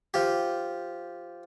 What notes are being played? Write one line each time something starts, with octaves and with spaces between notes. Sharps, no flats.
F3 G4